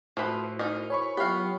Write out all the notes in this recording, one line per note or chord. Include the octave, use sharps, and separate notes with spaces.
A2 F3 E4 F#4 B4 C5
D#4 A#4 D#5
C#5 G#5 B5 C#6
F#3 B3 F4 G4 C#5 F5